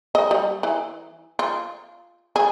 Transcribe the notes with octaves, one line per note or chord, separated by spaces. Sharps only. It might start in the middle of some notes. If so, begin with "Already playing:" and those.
D#5
G3
E3
F4
G#4